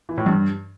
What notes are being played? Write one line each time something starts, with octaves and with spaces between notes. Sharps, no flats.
E3
A2
G2